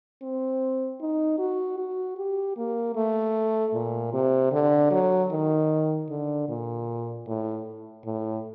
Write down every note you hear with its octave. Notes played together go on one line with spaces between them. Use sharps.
C4
D#4
F#4
F#4
G4
A#3
A3
A#2
C3
D3
F#3
D#3
D3
A#2
A2
A2